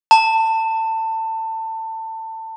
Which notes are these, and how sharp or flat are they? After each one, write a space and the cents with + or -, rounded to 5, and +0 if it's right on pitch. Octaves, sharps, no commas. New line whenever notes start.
A5 +25